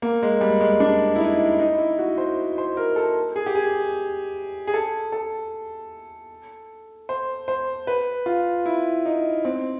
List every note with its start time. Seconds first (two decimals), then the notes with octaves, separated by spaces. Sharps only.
0.02 A#3
0.23 G#3
0.41 G3
0.61 G#3
0.80 D4
1.15 E4
1.21 D#4
1.60 D#4
1.78 E4
1.99 F#4
2.18 C5
2.58 C5
2.77 A#4
2.96 A4
3.36 G#4
3.46 G4
3.55 G#4
4.67 G#4
4.74 A4
5.12 A4
7.09 C5
7.48 C5
7.87 B4
8.26 F4
8.66 E4
9.06 D#4
9.45 C4